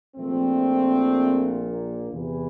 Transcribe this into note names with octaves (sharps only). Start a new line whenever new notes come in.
A#1 A#2 F3 A3 C4
A#3
E2 C3 E3